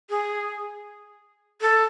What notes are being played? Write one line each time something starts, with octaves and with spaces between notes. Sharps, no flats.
G#4
A4